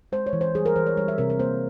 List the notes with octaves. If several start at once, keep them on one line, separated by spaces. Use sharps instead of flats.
G#3 C5
C#5
E3
C5
G3 G#4
A#4
E3 C5
C#5
G3 C#5
E5
C3 A#4
A#4
A#3 C5